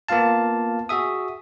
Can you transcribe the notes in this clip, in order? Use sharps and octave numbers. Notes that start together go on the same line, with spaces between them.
A#3 B3 F4 F5 A5
F#4 G#4 E5 D#6